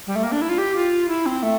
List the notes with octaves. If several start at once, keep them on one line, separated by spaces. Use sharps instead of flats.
G3
A3
A#3
D4
E4
F4
G4
F4
E4
C4
A3